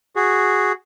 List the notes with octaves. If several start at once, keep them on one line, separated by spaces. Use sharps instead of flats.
F#4 G#4